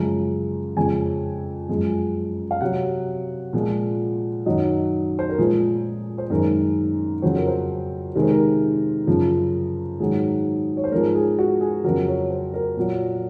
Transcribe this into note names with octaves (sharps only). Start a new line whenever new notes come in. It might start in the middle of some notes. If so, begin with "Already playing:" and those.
Already playing: F#2 C#3 F3 G#3 A#5
F2 C#3 G#3 G#5
F#2 F3 G#3
F5
C3 F#3 F#5
A#2 F3 G#3
F#2 D#3 F#3 D#5
C5
A#4
A#2 F3 G#3 G#4
C5
F#2 D#3 G#3 A#4
F2 C#3 F#3 C5
A#4
C5
C3 D#3 G#3 A#4
C5
A#4
F#2 C#3 F3
G#2 D#3 F#3 G#4
C#5
C5
G#2 F3 G#3 A#4
G#4
F#4
G#4
F2 C#3 F#3 A#4
C#5
C5
A#4
A#2 F#3